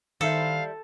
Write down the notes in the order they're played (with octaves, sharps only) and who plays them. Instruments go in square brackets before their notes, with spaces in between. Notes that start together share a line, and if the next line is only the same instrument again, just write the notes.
[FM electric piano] D#3 [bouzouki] G3 E4 C5 [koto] A4 [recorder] F5